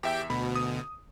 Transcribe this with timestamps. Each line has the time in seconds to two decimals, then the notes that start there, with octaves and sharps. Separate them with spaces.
0.03 E2 G4 E5 G5
0.30 D2 B2 B5
0.56 D#6